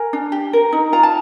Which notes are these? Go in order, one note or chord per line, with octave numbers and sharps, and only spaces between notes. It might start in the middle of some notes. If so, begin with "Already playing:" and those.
Already playing: A#4 G#5
D4
G4
A#4
D#4
F4 A#5
A5